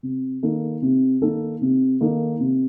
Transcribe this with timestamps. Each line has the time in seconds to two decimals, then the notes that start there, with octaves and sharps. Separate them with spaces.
0.03 C3
0.43 D#3 A#3 D#4 A4
0.82 C3
1.21 D#3 A#3 D#4 A4
1.62 C3
2.01 D#3 A#3 D#4 A4
2.40 C3